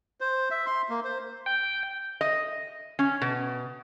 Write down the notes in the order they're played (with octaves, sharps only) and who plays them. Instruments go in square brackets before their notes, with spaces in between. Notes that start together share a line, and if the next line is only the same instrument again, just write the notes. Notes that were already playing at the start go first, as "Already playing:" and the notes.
[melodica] C5
E5
C6
A#3
C5
[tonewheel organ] G5
[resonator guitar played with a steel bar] D#5
C#4
B2